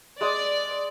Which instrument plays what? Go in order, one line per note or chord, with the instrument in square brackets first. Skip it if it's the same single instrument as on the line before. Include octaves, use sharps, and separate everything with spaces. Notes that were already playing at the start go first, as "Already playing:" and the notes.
[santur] G#3 D#6 [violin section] D5